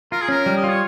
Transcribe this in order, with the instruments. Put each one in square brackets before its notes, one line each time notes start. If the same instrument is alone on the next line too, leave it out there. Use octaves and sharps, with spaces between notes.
[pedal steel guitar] F4 [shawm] A#4
[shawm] G#4
[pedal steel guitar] C#4 [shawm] A#4
[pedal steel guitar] G3
[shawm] D#5
[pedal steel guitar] F4
[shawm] C#5